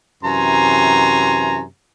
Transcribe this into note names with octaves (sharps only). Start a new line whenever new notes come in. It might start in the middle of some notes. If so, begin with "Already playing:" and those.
F#2 C3 E3 G#5 A#5 C6